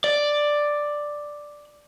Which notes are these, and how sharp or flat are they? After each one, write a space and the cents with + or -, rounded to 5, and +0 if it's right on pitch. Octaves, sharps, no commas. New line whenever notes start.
D5 +5